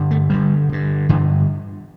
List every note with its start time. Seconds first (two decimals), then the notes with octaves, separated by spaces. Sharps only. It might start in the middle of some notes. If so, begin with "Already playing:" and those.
Already playing: G2 D3
0.11 A3
0.30 G2 D3 G3
0.69 G2 D3
1.09 G2 D3 E3